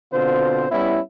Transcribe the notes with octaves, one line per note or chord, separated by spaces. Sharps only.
B2 D3 C4 F4 C5
G3 B3 C#4 E4